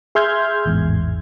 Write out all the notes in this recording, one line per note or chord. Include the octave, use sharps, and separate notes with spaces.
G#4 E5 C6 F6 G6 G#6
A1 E2 G#2